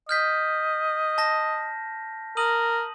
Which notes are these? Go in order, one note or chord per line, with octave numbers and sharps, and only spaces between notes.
D#5 F6 G6 B6
A5 A#6
A#4 D#6 D#7 F#7